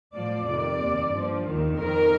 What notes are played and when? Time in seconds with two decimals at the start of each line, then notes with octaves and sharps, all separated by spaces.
0.14 A2 F3 D5
0.47 F2 C3 D#3 D5
0.81 D#2 D#3
1.12 G2 F3
1.45 D#2 D#3
1.77 F2 D#3 A#4